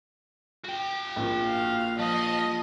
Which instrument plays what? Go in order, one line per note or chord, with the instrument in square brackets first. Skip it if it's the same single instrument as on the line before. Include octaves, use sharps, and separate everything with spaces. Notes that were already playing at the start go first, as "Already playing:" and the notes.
[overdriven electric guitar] F#4 G5
[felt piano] A#1 A#2
[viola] F5
[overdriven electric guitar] F3 [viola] D#5